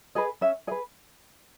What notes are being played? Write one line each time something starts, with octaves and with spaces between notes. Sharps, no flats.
G#4 B4 D#5
C#4 E5
G#4 B4 D#5